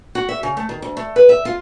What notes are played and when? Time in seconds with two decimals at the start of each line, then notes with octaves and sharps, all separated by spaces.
0.15 F#4
0.29 E5
0.43 C#3
0.57 A3
0.69 D#3
0.82 D2
0.97 A3
1.16 B4
1.29 E5
1.45 F4